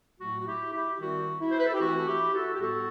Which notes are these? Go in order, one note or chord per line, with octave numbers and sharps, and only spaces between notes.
A2 F#3 A3 F#4
F#4
E4 G4
E4 G4
D#3 G3 C4 F#4
E4
C5
B4
A4
G4
E3 A3 C4 F#4
A4
E4 G4
F#4 A4
G4
A2 G3 B3 F#4 A4